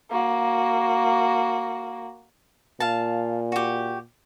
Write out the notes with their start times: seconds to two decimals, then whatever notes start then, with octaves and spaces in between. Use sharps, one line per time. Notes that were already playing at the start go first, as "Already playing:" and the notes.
0.11 A#3 F#4
2.80 A#2 F5 A5
3.52 F#4 G4